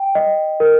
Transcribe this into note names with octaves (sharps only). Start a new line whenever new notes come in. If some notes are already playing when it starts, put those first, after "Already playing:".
Already playing: G5
D#5
A#4